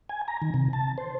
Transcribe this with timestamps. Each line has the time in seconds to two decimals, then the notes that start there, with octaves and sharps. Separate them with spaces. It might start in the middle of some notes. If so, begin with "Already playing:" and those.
0.09 G#5
0.28 A#5
0.42 D#3
0.54 C3
0.73 A5
0.98 C5